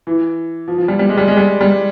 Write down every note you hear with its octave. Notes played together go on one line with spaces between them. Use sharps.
E3
F3
F3
G3
G3
G#3
G3
G#3
G3
G3